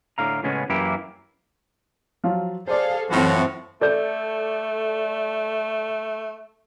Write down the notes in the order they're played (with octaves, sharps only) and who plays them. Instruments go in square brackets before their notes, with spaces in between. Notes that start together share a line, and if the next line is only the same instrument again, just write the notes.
[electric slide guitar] A2 D3 F5 A#5
A2 C#3 G#3 B3 C#4
F#2 E3 A#3 E4 G4
[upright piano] F3 F#3 F4
[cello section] G#4 A4 F5 [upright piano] C5 D5
[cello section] F#2 E3 C4 [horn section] A2 F3 F#4
[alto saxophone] A3 [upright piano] A4 D5 G6